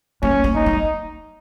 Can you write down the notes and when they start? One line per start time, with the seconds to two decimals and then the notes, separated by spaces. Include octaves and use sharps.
0.22 A#3 C#4
0.44 A#3
0.55 D#4
0.66 B3